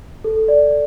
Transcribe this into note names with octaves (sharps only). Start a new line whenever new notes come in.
A4
D5